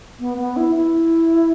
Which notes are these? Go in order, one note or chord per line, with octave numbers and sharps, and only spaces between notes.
B3
B3
E4
E4